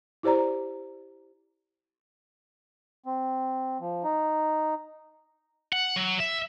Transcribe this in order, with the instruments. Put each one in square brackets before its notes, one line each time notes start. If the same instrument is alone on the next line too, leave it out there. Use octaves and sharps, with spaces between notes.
[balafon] E4 G4 C5 D5 A#5
[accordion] C4
F3
D#4
[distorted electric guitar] F#5
F#3
E5